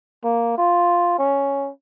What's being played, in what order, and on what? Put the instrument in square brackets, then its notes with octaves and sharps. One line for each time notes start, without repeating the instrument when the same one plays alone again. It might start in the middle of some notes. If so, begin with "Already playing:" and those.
[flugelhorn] A#3
F4
C#4